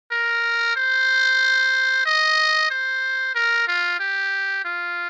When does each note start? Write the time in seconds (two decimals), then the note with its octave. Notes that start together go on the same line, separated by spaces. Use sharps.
0.12 A#4
0.76 C5
2.06 D#5
2.71 C5
3.35 A#4
3.68 F4
4.00 G4
4.65 F4